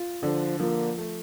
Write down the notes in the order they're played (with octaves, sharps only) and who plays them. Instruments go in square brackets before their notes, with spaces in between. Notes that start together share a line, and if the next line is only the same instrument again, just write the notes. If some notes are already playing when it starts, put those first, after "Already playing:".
Already playing: [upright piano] F4
[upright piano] D3 [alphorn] F3
[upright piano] F3 [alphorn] A#3
[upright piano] A3